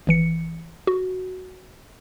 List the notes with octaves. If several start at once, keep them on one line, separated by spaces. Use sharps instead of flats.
G#1 E3 C#7
F#4